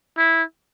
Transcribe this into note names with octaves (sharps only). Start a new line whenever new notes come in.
E4